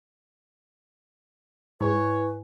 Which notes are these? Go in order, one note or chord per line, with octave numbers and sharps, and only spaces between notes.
G#2 E4 B4 C#5 G#5